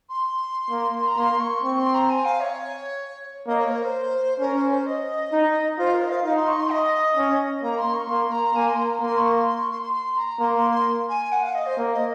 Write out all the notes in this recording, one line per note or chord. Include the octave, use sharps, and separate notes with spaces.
C6
A#3
A#5
A#3 C6
C#6
C4 C#6
C6
A#5
G#5
F5
C#5
A#3 D#5
C#5
A#4
C5
C#4 A#4
C5
C5
D#5
D#4
F4 C5
A#4
D#5
F5
D#4 F5
C6
C#6
C6
D#5
C#4
A#3 A#5
C6
C#6
A#3 C6
A#5
A#3 G#5
C6
A#5
A#3 C6
C#6
C6
C6
C#6
C6
C6
C6
A#5
A#3 C6
C6
C6
G#5
F#5
F5
D#5
C5
A#3
D#5